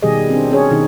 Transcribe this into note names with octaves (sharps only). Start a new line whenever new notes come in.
B2 D#3 G3 G4 G#4 D#5
C4 D4
C#4 G#4 C#5
B2 D#3 D#4 G#4